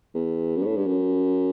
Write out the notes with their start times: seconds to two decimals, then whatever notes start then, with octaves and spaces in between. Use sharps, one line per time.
0.15 E2
0.56 F#2
0.62 G2
0.66 A2
0.76 G2
0.86 F#2